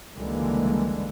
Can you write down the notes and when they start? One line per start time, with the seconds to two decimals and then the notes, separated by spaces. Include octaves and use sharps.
0.16 C#2 D3 E3 G3 G#3 A#3